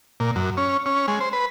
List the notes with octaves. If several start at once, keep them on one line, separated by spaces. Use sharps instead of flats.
A#2
F#2
C#4
C#4
G#3
C5
B4